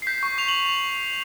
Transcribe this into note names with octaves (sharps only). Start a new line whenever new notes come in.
C7
G6 B6
C#6
C#6 F7
F#7